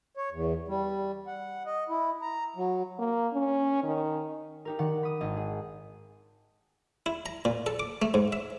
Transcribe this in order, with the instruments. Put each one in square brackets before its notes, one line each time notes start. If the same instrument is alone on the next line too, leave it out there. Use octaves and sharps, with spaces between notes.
[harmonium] C#5
E2
G3
F#5
D#5
E4
A#5
F#3
[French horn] A#3
C#4
D#3
[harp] D#4 G4 A#4
D#3 D5 F#5
B5 D#6
G#1 D#5
G#4
[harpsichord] E4
A#5
A#2
A4
D6
A3
G#2
E5